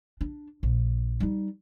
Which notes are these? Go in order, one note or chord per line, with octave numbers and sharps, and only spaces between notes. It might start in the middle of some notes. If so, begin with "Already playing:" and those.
D4
A#1
G3 D#4